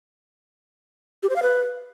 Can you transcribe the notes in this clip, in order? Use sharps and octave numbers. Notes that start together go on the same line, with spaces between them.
G4
C5
F5
B4